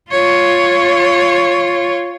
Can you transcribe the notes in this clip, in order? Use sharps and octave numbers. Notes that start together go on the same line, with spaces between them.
F4 C#5